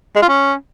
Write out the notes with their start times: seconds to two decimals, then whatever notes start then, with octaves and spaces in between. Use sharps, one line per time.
0.16 G#3
0.22 F4
0.29 C#4